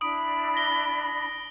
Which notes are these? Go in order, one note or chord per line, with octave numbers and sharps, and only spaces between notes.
D4 E4 B5 D#6 D7
A#6 G7